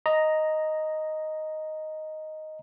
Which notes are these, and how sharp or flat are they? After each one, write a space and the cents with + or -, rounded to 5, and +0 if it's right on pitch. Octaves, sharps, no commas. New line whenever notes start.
D#5 +0 A#5 +0